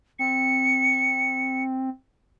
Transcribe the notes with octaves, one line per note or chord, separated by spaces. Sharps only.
C4 C#7